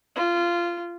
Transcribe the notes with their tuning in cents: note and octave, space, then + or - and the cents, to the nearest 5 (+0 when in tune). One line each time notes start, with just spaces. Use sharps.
F4 -15